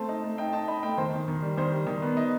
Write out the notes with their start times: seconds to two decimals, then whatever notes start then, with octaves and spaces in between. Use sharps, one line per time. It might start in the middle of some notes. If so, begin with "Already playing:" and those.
Already playing: A3 C4 A5
0.09 D#4
0.24 A3
0.38 D#4 G5
0.53 D#4 A5
0.68 D#4 B5
0.83 A3 G5
0.98 D#3 C5
1.13 D#3
1.28 D#3
1.42 G3
1.57 D#3 C5
1.72 G3
1.87 D#3
2.02 B3
2.17 D#4